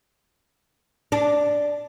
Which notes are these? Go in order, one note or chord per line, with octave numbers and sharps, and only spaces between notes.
D4